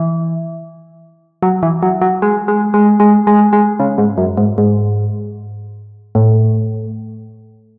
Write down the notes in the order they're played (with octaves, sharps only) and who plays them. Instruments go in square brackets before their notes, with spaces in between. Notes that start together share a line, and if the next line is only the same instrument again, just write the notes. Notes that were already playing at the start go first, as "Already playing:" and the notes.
Already playing: [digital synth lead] E3
F#3
E3
F#3
F#3
G#3
G#3
G#3
G#3
G#3
G#3
C#3
G#2
F#2
G#2
G#2
A2